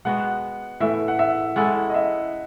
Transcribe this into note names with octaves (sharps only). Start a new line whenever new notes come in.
G#3 B3 F#4 F#5
A2 E3 A3 E5
F#5
E5
G#3 C#4 E4 A4 F#5
D#5
E5